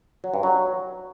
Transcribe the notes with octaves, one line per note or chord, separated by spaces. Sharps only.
F#3
G2
F#3